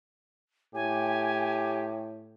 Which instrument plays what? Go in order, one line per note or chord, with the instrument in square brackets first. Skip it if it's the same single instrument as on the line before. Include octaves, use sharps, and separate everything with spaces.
[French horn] A2 [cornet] G4 [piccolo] G#5